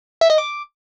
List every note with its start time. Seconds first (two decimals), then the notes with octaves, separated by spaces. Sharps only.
0.21 E5
0.30 D#5
0.38 D6